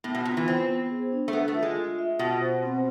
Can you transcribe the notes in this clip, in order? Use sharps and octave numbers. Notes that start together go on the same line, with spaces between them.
A2 B3
B2
C3 F4
E3
C4 C5
B3
G#4
D4
A3
B3 D4
A3
F4
G#3
F4
E5
B2 F4
C5
C4